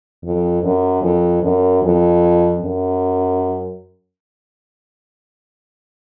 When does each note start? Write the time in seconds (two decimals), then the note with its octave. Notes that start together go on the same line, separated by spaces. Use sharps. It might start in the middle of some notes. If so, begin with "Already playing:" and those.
0.24 F2
0.63 F#2
1.03 F2
1.43 F#2
1.83 F2
2.62 F#2